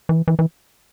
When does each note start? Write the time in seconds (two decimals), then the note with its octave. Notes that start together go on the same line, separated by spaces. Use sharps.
0.09 E3
0.28 E3
0.39 E3